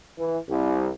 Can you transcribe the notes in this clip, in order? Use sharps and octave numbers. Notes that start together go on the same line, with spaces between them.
E3
C2